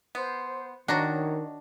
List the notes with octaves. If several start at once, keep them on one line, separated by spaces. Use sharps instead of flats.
B3 C5
D#3 D4 F#4 C#5 F#5 A#5